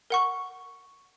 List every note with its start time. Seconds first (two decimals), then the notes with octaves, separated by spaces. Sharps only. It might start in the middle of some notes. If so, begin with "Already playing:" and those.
0.10 A#4 F#5 C#6